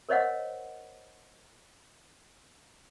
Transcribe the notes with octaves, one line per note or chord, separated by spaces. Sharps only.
A#4 C5 C#5 D#5 F5 F#5